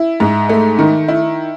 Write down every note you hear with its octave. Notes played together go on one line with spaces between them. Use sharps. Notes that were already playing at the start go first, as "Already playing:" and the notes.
Already playing: E4
G#2
A3
D#3
E4